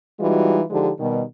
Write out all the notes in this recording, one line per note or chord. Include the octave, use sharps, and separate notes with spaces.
E3 G3 G#3 D#4 F4 F#4
D3 F3 G#3 D#4 G4
B2 D#3 G3